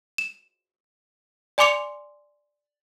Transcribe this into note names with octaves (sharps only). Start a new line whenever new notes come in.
E7
D5 G#5 C6 D6 C#7 F7